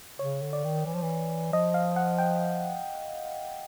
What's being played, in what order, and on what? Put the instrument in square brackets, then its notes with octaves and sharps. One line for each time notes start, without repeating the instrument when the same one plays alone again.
[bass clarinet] C#3 [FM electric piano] C#5
[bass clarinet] D3
[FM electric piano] D5
[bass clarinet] D#3
E3
F3
E3
[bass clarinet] F3 [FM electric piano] D#5
[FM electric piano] F5
F#5
G5